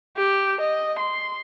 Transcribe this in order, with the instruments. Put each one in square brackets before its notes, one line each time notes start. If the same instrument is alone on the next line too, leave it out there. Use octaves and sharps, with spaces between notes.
[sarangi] G4
D#5
C6